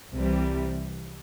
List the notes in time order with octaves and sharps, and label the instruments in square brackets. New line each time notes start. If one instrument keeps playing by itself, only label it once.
[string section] C2 C3 E3 G3